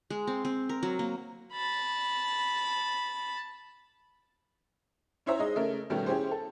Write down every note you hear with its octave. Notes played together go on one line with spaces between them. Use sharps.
G#3
C4
C4
A#4
F#3
A#3
A5 B5
C#4 E4 C5 C#5 E5 A#5
G#3 D#4 D#5
C#3 A3 C#4 A#4
B2 D#3 G3 A3 B3 C#4
C#4 E4 G4 G#4 C5
A4